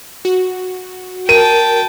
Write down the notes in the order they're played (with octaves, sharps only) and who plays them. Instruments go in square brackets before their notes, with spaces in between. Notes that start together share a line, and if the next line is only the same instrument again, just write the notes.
[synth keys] F#4
[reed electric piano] A#4 [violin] G5 A5 [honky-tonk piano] D#7